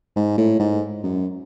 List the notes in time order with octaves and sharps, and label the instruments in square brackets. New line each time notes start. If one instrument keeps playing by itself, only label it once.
[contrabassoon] G#2
A2
G#2
F#2